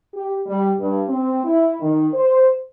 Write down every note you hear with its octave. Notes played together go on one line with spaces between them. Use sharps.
G4
G3
G2
C4
E4
D#3
C5